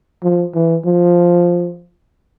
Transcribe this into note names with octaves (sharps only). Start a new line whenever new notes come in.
F3
E3
F3